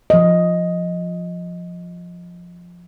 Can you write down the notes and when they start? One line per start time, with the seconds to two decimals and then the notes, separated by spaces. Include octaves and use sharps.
0.10 F3 D#5